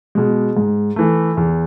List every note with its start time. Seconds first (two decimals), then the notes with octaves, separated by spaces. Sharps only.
0.15 B2 G#3
0.57 G#2
0.96 E3 A3
1.37 E2